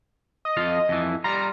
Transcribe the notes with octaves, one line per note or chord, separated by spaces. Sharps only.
D#5
F2 F4 F5
F2 E3
G3 F4 A#5